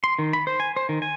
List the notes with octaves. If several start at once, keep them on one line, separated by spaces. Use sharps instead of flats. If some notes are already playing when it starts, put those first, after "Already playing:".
C6
D#3
B5
C5
G#5
C5
D#3
G#5